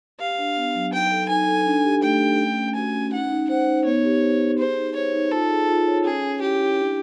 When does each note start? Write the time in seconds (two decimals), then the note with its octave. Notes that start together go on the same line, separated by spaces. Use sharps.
0.19 G4 F5
0.38 D4
0.56 B3
0.75 F#3
0.92 D#4 G5
1.11 A4
1.29 D#4 G#5
1.47 A4
1.66 D4
1.84 G4
2.03 A3 G5
2.20 A3
2.39 C#4
2.57 C#4
2.75 F#4 G#5
2.94 C#4
3.12 D#4 F#5
3.31 D#4
3.49 C5 F#5
3.67 D#4
3.85 B3 C#5
4.04 G4
4.21 C5
4.41 G4
4.58 G#4 C5
4.77 D#4
4.95 C5 C#5
5.13 D#4
5.32 F4 A4
5.50 G#4
5.68 F4
5.87 C#5
6.04 C#4 G#4
6.23 C#4
6.41 E4 G4
6.60 E4
6.78 D4